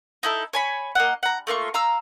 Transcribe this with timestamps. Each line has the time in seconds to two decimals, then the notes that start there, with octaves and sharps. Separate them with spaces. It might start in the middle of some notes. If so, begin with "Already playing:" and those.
0.23 D#4 E4 A4
0.53 C#5 G#5 B5
0.95 A#3 D#5 F#5
1.23 F#5 A#5
1.47 A3 A#3 F4 C#6
1.74 F5 A#5 E6